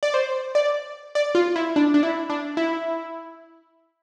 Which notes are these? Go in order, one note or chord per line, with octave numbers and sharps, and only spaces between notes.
D5
C5
D5
D5
F4
E4
D4
D4
E4
D4
E4